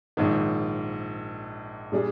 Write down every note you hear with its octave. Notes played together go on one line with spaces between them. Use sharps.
A#1 G#2 D#3
A#2 G3 D4 G#4